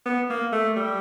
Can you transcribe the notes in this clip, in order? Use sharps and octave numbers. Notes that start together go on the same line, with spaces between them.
B3
A#3
A3
G3